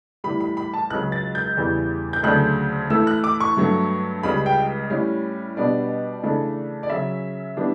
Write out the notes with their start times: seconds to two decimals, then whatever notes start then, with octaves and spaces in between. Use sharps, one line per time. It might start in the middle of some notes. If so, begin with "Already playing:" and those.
0.24 A2 E3 G3 B5
0.40 B5
0.57 B5
0.74 A5
0.90 C#2 C#3 F#3 F#6
1.12 A6
1.35 G6
1.57 E2 C#3 E3 G3
2.13 G6
2.23 D2 C#3 F#3 A3 D4 F#6
2.90 A2 E3 A3 E6
3.07 F#6
3.24 D6
3.40 C#6
3.57 G2 F#3 A3
4.23 C#2 C#3 G3 B5
4.46 G5
4.90 A2 G3 C#4
5.57 B2 G3 B3 D4 D5
6.23 C#3 E3 A3 D4
6.83 D5
6.90 C#3 F#3 C#4 E5
7.57 E3 G3 B3 D4